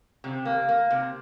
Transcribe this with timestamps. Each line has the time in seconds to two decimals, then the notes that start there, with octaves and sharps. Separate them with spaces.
0.24 C3
0.45 A#3
0.69 A#3
0.91 C3